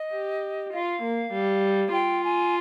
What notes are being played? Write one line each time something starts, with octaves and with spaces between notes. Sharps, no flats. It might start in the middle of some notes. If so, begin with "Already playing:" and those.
Already playing: D#5
G4
F4 F5
A#3
G3
F4 G5
G#5